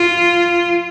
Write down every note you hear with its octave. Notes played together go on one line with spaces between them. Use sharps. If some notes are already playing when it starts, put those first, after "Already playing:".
Already playing: F4